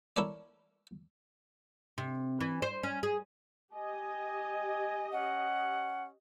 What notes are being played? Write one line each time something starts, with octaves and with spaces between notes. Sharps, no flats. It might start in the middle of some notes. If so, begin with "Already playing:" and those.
E4 A4 A#4 C#5 D5
C3
E3
C5
C#4
G#4
G4 D#5 G#5
C#4 F#5